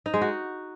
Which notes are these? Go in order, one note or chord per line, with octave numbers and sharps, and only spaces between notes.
D#4
G#3
F#4